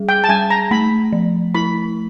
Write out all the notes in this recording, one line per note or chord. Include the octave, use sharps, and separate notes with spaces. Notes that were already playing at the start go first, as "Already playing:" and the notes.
Already playing: G3 G#4
G5
A5
G3 G#5
A#5
A3 B5
F3
E4 B5